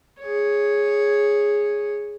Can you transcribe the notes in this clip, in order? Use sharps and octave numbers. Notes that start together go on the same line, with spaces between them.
G#4 C#5